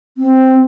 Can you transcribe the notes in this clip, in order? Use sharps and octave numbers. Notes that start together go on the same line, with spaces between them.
C4